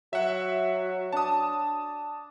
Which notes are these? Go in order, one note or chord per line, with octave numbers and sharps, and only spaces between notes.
F#3 E5 F#5
D4 A5 D#6